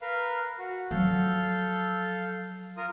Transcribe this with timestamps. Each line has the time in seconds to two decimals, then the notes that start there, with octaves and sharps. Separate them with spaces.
0.02 A#4 B4 F5
0.58 F#4
0.91 F3 F#3 A4 F5 G6
2.77 F4 A#4 D#6